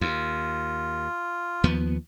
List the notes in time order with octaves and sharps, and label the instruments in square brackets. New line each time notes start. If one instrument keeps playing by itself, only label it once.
[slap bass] D#2 [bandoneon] F4
[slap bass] D#2 F3 B3